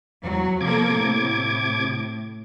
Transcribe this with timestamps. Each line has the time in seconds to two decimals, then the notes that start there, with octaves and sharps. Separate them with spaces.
0.24 E2 F#3
0.61 C3 F3 A#3 A4 D6 G#6
0.94 A2